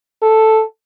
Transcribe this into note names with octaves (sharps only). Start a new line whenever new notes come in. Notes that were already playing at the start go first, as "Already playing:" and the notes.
A4